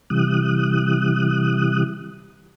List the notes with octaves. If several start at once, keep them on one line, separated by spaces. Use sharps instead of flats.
C3 E3 G3 D#6 F#6